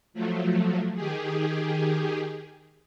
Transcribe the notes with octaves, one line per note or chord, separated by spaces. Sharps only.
F3 F#3 A3
D#3 G4 G#4